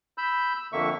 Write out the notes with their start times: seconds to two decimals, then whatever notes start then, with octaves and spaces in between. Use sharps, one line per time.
0.18 B5 E6 G6
0.56 E6
0.73 F2 D3 A#3 E5 C#6